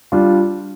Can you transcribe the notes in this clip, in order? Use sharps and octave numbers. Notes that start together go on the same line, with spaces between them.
G3 D4 F4